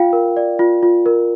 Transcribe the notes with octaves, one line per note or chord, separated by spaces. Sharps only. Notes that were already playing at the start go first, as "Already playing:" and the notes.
Already playing: F4 F5 G5
A#4
D5
F4
F4
A#4